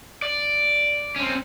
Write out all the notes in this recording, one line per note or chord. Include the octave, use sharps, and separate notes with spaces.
D5
C4 C#4